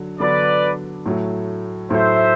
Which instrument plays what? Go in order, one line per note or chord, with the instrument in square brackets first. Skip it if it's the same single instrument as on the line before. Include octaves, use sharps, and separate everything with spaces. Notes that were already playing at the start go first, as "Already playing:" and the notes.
Already playing: [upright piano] D3 F#3
[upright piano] D3 F#3 B3 D4 [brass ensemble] B4 D5
[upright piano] A2 F#3 A3
[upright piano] A2 F#3 A3 [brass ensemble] C5 E5